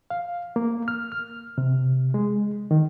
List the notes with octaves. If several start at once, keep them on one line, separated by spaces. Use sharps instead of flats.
F5
A#3
F6
F6
C3
G#3
D#3